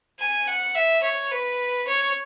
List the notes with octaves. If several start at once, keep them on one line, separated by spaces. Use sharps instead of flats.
G#5
F#5
E5
C#5
B4
C#5